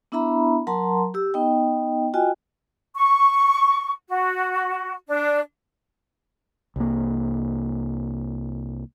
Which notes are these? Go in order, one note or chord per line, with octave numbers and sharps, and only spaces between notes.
B3 D4 E4 E5 A#5 B5
F#3 A#4 F#5 A5 A#5 C6
G4 E6
B3 D#4 D#5 G5
F4 F#4 D#5 G5 G#5
C#6
F#4
D4
C2 A#3